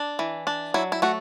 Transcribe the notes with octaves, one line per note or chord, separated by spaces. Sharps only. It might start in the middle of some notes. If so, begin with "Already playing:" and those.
Already playing: D4
E3
D4
F#3 E4
E4
A3 F#4